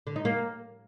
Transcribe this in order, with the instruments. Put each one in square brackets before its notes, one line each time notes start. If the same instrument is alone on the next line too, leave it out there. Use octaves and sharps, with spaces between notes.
[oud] D3
D#4
A#3